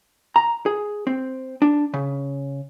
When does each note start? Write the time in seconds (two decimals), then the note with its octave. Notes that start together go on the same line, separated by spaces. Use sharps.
0.36 A#5
0.66 G#4
1.07 C4
1.62 D4
1.94 C#3